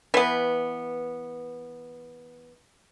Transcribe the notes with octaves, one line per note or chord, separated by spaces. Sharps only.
E3 B3